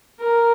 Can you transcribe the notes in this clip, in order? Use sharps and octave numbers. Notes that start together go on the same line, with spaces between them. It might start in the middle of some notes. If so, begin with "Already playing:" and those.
A#4